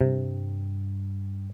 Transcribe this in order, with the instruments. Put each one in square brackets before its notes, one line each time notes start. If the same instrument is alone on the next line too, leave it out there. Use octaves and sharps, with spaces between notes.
[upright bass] G2 [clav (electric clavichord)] C3